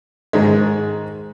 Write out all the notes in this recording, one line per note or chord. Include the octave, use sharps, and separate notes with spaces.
G#2 D#3 G#3